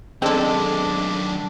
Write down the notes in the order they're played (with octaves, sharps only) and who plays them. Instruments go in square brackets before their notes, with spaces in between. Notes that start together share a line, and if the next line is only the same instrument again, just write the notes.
[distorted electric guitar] F#2 D#3 [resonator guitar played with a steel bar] G#3 [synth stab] C4 A4 [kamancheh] D4